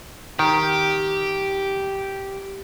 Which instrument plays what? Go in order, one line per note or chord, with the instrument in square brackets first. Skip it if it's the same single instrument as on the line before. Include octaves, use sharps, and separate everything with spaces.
[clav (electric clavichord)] D#3 [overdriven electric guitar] G4